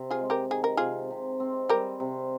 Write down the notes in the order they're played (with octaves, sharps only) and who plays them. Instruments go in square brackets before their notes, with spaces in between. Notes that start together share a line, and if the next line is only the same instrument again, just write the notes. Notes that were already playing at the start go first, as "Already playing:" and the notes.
Already playing: [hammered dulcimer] C3
[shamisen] F4 G#4
[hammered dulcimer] G#3
[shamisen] G4 A#4
[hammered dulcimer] D#3 [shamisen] G#4
[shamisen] A#4
[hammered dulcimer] C3 [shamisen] F4 G#4
[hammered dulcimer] C3
C4
[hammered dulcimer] G3 [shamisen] G4 A#4
[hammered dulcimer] C3